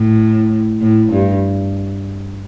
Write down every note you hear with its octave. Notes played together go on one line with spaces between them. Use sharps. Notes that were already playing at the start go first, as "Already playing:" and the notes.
Already playing: A2
A2
G2